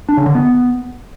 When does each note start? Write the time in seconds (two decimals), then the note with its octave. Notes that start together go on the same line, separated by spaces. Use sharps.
0.09 D4
0.17 C#3
0.26 D3
0.35 B3